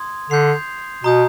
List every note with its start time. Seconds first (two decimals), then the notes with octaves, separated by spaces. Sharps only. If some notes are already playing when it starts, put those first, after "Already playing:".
Already playing: C6 D#6 G#6
0.30 D3 G6 C7 F7
1.04 B2 A#5 D#6 G6